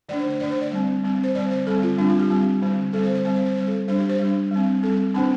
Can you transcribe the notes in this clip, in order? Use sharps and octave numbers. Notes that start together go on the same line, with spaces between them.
D3 A3 D4 D5
C5
C5
D3 A3 D4 D5
C5
D5
G3 C4
G3 C4
C5
D3 G3 C4 D5
C5
D3 G3 C4 A4
F4
G3 C4 D4
F4
G4
G3 C4
D3 G3 C4
D3 G3 C4 A4
C5
C5
G3 C4 C5
C5
C5
G3 C4 C5
A4
G3 D4 C5
G4
C5
G3 D4
G3 C4
G3 C4 A4
D3 A3 C4 D4